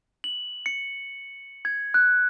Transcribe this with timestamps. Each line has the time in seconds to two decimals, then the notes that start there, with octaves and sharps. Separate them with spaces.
0.24 F#7
0.66 C#7
1.65 G#6
1.94 F#6